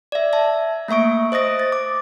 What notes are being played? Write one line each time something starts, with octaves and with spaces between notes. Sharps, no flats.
D5 E5
E5 A5
A3 A#3 E5 C#6 D7
C5 D#5 D#6 A#6 D7
A6
D6